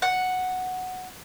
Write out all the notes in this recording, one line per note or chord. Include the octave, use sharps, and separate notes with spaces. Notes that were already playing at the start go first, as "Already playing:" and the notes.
F#5